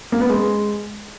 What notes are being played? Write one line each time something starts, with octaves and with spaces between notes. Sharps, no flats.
A#3
B3
G#3